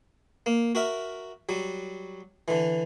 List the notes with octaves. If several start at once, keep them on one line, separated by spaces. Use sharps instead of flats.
A#3
F#4 A#4 E5
F#3 G3
D3 E3